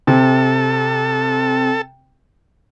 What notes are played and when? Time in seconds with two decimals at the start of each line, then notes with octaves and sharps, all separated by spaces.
0.07 C3 A4